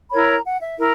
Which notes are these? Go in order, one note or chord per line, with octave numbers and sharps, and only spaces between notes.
E4 A#4 C#5 B5
A#5
F#5
E5
E4 A#4